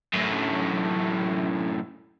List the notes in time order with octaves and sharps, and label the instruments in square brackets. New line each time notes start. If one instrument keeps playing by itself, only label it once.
[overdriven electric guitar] F#2 A2